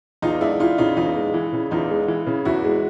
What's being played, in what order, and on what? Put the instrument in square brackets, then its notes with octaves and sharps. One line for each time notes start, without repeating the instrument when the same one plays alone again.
[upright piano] E2 [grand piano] D#4 F4
[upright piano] G#3 [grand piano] D4 E4
[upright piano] E3 [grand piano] D#4 F4
[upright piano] C#3 [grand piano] D#4 F4
[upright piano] E2 [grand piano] D#4 F4
[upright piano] G#3
E3
C#3
[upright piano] E2 [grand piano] D#4 F4
[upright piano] G#3
E3
C#3
[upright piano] E2 [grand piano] E4 F#4
[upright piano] G#3